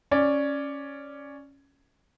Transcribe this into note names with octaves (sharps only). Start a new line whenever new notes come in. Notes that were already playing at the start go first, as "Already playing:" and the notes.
C#4 D5